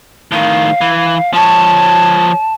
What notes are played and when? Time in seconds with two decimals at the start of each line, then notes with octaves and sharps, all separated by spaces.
0.32 A2 D#3 F5
0.81 E3
1.33 F3 C#5 A5